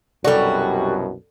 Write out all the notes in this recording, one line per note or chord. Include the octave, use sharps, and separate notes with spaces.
C2 F#2 B2 G3 F#4 A4 D5